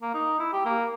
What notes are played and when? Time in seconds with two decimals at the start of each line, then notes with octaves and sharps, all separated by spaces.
0.02 A#3
0.14 D#4
0.39 E4
0.53 G4
0.65 A#3